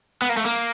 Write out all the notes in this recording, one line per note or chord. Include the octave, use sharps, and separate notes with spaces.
B3
A#3
A3
A#3